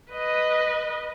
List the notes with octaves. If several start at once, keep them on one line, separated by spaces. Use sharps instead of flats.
B4 D#5